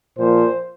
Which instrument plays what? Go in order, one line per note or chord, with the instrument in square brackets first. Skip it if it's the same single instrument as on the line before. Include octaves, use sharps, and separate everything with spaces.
[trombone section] A#2 F3 C5